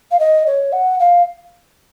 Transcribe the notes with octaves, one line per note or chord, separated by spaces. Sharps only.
F5
D#5
C#5
F#5
F5